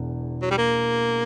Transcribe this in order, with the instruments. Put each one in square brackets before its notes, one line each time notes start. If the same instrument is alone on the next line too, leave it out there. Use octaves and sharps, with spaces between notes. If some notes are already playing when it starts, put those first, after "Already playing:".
Already playing: [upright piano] E1 E2
[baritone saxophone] F#3
G3
A#3